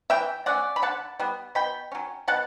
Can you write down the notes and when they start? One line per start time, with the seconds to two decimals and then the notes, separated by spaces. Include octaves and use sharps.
0.10 E3 E5 G5
0.46 A3 C#4 D5 F#5
0.76 B5
0.82 D3 F#5 A5
1.19 G3 B3
1.55 B2 G5 B5
1.92 F#3 C#4
2.28 B2 F#5 A5